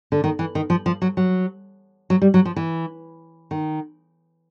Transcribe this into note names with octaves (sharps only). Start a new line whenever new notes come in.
D3
D#3
E3
D#3
F3
F3
F#3
F#3
F#3
G3
F#3
F3
E3
D#3